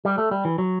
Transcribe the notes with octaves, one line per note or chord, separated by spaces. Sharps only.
G3
A3
G3
E3
F#3